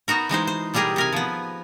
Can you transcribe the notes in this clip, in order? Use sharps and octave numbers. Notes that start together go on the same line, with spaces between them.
B3 D#4 F#4 A#4
E3 G#3 D#4 C5
C5
B2 G3 G4 G#4 A#4
C3 A#4 G#5
F3 B3